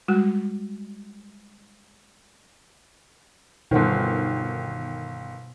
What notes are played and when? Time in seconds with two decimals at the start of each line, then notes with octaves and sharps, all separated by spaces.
0.08 G3 G#3 F#4
3.71 G1 B2 D#3 C5 F#5